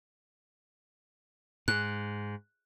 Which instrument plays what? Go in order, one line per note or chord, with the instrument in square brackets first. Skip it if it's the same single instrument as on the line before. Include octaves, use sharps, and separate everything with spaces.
[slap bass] G#2 [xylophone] F#6